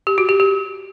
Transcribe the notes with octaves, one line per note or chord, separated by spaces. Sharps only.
G4
F#4
G4
G4